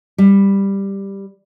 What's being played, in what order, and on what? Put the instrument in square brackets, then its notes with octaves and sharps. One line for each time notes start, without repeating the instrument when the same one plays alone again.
[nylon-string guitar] G3